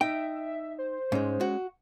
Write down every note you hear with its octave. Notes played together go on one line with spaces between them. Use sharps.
D#4 E5 G5
C5
G#2 G#3 C#4
F#4